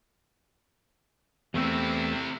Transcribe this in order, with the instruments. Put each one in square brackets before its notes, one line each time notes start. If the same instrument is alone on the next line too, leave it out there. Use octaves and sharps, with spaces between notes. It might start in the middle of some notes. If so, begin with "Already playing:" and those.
[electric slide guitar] E2 A3 C4 [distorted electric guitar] C3 E4